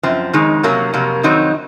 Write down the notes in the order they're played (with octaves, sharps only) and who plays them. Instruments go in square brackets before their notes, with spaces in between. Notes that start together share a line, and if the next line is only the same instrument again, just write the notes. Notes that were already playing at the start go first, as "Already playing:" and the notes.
[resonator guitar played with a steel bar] F#2 F3 C4
F2 D#3 G#3 D#4
C3 F#3 A#3 C#4
F2 C3 F#3 A#3
F2 D#3 F#3 C4 D#4